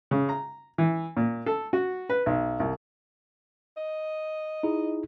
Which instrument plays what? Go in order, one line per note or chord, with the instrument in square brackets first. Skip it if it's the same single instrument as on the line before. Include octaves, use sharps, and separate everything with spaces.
[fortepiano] C#3
A#5
E3
A#2
A4
F#4
B4
B1
C2
[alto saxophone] D#5
[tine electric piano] D#4 E4 G#4